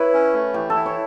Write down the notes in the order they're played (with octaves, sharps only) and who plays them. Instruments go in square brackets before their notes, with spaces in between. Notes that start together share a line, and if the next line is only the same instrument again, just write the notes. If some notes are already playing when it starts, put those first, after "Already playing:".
Already playing: [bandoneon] E4 [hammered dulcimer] B4 C#5
[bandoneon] C#4
A3
[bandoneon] E3 [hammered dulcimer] G4
[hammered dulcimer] A4
[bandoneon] E4
[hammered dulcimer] C#5